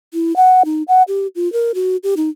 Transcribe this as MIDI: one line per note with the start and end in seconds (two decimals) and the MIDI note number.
0.14 0.35 64
0.36 0.63 78
0.65 0.83 63
0.88 1.03 78
1.08 1.27 67
1.36 1.51 65
1.53 1.72 70
1.75 1.97 66
2.03 2.14 67
2.17 2.29 63